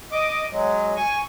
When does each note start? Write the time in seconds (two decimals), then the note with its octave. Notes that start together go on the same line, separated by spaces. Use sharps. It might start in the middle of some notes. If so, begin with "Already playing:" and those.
0.12 D#5 D6
0.52 F#3 G#3
0.96 G#5 C#6